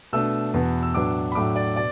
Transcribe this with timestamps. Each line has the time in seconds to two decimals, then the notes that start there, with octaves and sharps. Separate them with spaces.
0.13 B2 A3 D4 E6
0.54 E2 B2 B3
0.83 E6
0.94 A2 F#3 B3 D4 D6
1.32 B5
1.35 A2 F#3 A3 D4 D6
1.56 D5
1.76 B2 D5